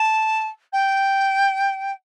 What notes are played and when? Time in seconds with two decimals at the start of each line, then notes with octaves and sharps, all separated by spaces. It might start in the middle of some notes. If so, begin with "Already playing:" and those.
Already playing: A5
0.73 G5